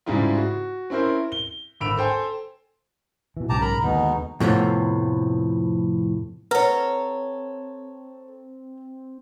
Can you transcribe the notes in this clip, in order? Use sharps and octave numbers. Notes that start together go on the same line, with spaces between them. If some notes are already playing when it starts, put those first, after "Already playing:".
G#2 C#3 G3 G#3 E4 F4
F#4
C4 C#4 E4 A#4 C5
G7
G#1 D3 B5 E6 D7 F7
A4 C5 G5 G#5
B2 E3
B1 G#2 C#3 G4 A5 A#5
A#4 A#5 B5
D#2 B2 D3 G#3 B3 D#4
F2 A2 C3 F3 B3
C4 A4 B4 C#5 F#5 A#5